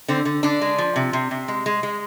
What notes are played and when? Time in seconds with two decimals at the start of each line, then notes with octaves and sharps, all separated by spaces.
0.08 D3 C4
0.25 D3
0.43 D3 D4
0.61 G#3
0.78 F3
0.96 C3
1.13 C3
1.31 C3
1.48 G#3
1.66 G#3
1.83 G#3